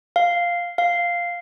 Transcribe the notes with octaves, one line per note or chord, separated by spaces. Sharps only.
F5
F5